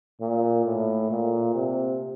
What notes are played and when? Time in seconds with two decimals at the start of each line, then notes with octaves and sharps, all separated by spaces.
0.21 A#2
0.65 A2
1.10 A#2
1.55 C3